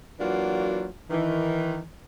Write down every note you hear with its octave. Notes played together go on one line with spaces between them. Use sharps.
E3 F#3 A#3 D4 F4 F#4
D#3 E3